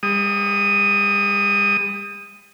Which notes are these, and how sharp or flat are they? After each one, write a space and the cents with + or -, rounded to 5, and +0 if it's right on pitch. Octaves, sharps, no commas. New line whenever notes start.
G3 +40 D#6 +0